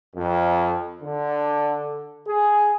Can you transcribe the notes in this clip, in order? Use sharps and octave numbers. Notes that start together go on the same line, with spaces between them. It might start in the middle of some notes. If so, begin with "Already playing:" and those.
F2
D3
G#4